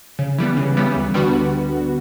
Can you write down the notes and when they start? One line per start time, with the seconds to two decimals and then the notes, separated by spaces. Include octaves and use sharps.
0.19 C#3
0.38 E3 G3 B3
0.57 C#3
0.77 E3 G3 B3
0.96 D2
1.14 D3 G3 B3 F#4